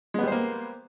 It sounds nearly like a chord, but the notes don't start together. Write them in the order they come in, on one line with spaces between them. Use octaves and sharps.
G#3 B3 G3 C5 A#3